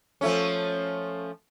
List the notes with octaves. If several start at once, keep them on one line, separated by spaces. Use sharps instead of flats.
F3 A3 C#4